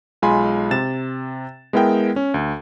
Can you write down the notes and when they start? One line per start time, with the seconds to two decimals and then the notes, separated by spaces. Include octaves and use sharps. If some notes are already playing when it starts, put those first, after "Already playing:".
0.22 B1 G#3 F4 G#5 B5 C6
0.71 C3 A6 E7
1.73 G#3 B3 E4 A#4 G5
2.16 C#4
2.34 D2